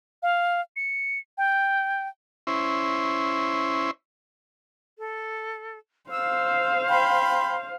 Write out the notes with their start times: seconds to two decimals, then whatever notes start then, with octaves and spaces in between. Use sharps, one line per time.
0.23 F5
0.76 C#7
1.38 G5
2.47 C#4 E4 C5
4.98 A4
6.10 C5 F5 E6
6.88 G5 B5 C6